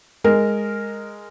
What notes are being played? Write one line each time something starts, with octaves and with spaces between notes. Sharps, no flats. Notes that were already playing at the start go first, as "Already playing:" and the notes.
G#3 A#4